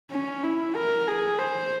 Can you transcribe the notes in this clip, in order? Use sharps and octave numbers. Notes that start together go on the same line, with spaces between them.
C#4
E4
A#4
G#4
C5